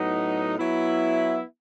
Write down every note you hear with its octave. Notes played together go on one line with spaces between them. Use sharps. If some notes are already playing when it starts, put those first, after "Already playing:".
Already playing: A2 F#3 B3 D#4
F#3 B3 E4